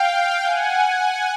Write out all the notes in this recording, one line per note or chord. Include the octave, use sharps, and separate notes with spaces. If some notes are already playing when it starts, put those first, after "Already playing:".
Already playing: F5 G5
F#5 G#5